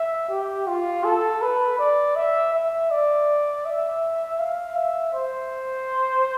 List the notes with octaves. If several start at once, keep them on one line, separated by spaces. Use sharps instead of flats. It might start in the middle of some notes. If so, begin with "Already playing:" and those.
Already playing: E5
G4
F4
A4
B4
D5
E5
E5
D5
E5
F5
E5
C5